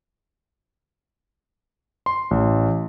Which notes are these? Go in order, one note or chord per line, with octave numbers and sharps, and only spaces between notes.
C6
A1